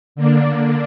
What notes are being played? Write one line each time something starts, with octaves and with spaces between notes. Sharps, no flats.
D3 A#3 D4